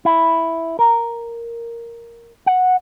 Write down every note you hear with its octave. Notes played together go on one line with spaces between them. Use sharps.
E4
A#4
F#5